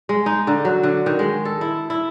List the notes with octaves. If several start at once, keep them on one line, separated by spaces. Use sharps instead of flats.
G#3
D#4
D3
F#3
D3
D#3
G#3
A4
E4
E4